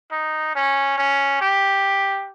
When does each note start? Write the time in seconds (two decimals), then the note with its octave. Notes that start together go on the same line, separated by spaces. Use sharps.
0.12 D#4
0.55 C#4
0.98 C#4
1.41 G4